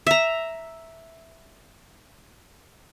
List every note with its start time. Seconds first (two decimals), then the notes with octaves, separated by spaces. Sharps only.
0.07 E5 A#5